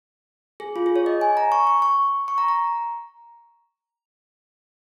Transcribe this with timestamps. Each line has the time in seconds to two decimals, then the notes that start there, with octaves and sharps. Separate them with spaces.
0.60 G#4
0.76 F4
0.86 G#4
0.96 C#5
1.06 D#5
1.21 G#5
1.37 A#5
1.52 C#6
1.67 C#6
1.82 C#6
2.28 C#6
2.38 A#5
2.48 A#5